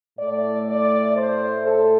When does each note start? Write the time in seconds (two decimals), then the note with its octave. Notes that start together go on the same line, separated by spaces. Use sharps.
0.18 A2 A3 D5
0.67 D5
1.16 C5
1.65 A4